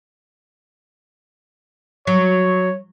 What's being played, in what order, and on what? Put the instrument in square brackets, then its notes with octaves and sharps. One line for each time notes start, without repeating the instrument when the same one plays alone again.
[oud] F#3 [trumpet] C#5